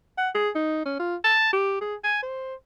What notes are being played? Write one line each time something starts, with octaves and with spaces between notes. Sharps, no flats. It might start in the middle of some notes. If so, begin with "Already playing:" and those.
F#5
G#4
D#4
C#4
F4
A5
G4
G#4
G#5
C5